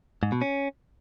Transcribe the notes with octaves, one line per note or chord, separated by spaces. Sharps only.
G#2
B2
C#4